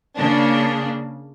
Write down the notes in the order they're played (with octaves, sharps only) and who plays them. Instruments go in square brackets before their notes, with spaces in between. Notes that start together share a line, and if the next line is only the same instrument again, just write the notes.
[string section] C#3 A#3 D4